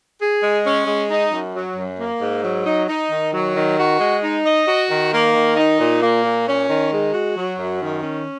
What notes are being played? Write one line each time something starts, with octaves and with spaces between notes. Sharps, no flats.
G#4
G#3
C#4
G#3
D#4
F#2
F#3
F#2
A#3
G#2
F#3
D#4
D#4
D#3
F#3
D#3
F#4
G#3
D#4
D#5
F#4
D#3
A#3
D#3
D#4
A#2
A#3
A#2
C#4
D#3
G#3
F#4
F#3
F#2
D#3
C#4